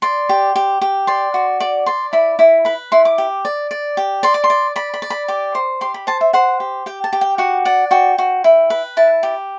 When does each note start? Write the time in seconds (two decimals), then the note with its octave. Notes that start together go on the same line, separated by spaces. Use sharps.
0.02 D5 C6
0.29 G4
0.56 G4
0.81 G4
1.07 D5 C6
1.34 F#4
1.60 D5 D6
1.86 D5 C6
2.13 E4 B5
2.39 E4 B5
2.65 B4 B5
2.92 E4 C6
3.05 D6
3.18 G4
3.45 D5
3.71 D5
3.97 G4
4.23 D5 C6
4.34 D6
4.44 C6
4.50 D5
4.76 D5 B5
4.94 B5
5.02 D5
5.10 B5
5.28 G4 D6
5.55 C5
5.81 G4 C6
5.94 B5
6.07 C5 A5
6.21 E5
6.33 C5 F#5
6.60 G4
6.86 G4 G5
7.04 A5
7.13 G4
7.21 G5
7.38 F#4 F#5
7.65 D5 F#5
7.91 F#4 G5
8.18 F#4
8.44 E4
8.70 B4
8.97 E4 A5
9.23 G4